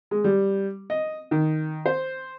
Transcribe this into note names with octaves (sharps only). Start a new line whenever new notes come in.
G#3
G3
D#5
D#3
C5